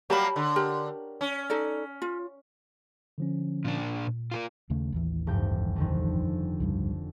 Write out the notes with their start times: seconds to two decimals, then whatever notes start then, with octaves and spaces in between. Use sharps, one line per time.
0.10 F#3 G3 A#3 G4 A5 B5
0.36 D3
0.56 G4 A#4
1.21 C#4
1.50 D#4 A4 D5
2.02 F4
3.18 D3 F3 C#4
3.65 A#2 D4
4.07 A#2
4.32 F4 A4 A#4
4.70 D#2 C#3 A3
4.92 A1 D#2 E3
5.27 F1 G2 G5
5.76 F2 D3 D#3
6.60 C#2 G2 G3